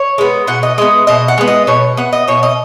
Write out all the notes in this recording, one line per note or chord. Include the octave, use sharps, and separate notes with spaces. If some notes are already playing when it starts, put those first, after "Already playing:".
Already playing: C#5
G#3 B3
B2 F#5
D#5
G#3 B3 D#5
B2 D#5
F#5
G#3 B3
D#5
B2 C#5
B3 F#5
D#5
B2 C#5
D#5